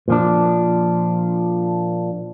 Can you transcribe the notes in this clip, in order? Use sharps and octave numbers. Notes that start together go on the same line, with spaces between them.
A#2 F3 D4